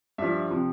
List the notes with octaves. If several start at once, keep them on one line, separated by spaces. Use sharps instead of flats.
G2 F3 E5
C3 F3